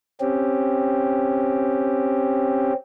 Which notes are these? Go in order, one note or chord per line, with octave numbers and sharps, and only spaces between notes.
C4 C#4 G4